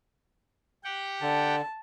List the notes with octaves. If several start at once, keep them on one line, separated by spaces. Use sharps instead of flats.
G4 F#5 G5
D3 A5